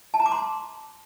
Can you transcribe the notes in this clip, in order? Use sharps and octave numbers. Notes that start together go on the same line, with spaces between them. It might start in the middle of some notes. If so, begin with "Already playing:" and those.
A5
A#5
D6
C6